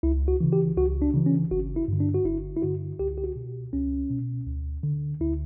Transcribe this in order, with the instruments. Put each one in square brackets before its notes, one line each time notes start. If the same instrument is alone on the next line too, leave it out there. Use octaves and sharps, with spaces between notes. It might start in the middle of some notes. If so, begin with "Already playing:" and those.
[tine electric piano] C#2 E4
F#4
C#3 E3
G4
C#2 F#4
D4
C#3 E3
C#4
G1 F#4
E4
G2 D3
D4
F#4
G1 E4
E4
G2 D3 F#4
C#2 G4
G4
F#4
B2
C#2 C#4
B2
D2
D3
D2 E4